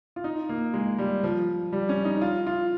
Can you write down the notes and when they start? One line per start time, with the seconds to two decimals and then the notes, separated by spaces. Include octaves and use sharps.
0.16 F4
0.24 D#4
0.49 A#3
0.74 G#3
0.98 G3
1.24 F3
1.72 G3
1.89 C#4
2.05 D#4
2.21 F4
2.47 F4